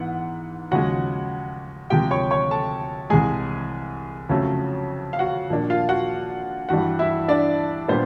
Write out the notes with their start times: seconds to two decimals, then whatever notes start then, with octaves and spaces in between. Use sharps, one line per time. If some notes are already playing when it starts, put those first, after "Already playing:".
Already playing: G#2 E3 B3 F#5
0.71 D#2 C#3 F3 G#3 F#4 F#5
1.90 D2 C3 F3 G#3 G4 G5
2.11 C#5 C#6
2.31 C#5 C#6
2.51 A4 A5
3.10 C2 C3 E3 G#3 G#4 G#5
4.29 F2 C#3 F#3 A3 C#4
5.13 F5
5.19 F#4 F#5
5.50 A#2 F3 A#3 D4
5.70 F4 F5
5.89 F#4 F#5
6.69 G2 E3 G3 F#4 F#5
6.99 E4 E5
7.28 D4 D5
7.88 A#2 G3 B3 D4 C5